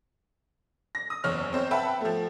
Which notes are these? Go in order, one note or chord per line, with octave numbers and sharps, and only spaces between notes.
A#6
D#6
F#1 E2 C#5 F6
C4 C5 C#5
B4 E5 F#5 G5 A5 B5
F3 A3